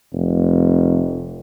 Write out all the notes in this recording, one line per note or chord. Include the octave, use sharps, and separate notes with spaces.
F1